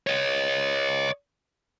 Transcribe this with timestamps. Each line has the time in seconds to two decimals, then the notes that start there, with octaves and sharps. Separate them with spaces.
0.07 C#5 D#5